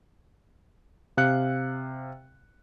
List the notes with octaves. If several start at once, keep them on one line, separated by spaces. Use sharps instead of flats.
C3 F5 F#6 C#7